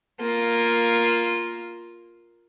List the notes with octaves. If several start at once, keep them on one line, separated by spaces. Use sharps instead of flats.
A#3 F4